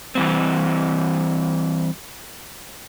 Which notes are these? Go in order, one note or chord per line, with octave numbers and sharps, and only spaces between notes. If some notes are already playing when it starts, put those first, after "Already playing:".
E3 G3 C4